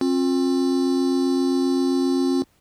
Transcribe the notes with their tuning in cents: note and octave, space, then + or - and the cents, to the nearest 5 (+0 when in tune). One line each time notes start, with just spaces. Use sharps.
C4 +40 F4 +30